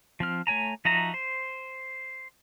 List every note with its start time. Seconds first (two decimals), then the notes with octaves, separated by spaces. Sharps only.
0.20 F3 C4 F6
0.47 A3 C#5 G#5 A#5
0.85 F3 D#4 F#4 E5 A#5
1.14 C5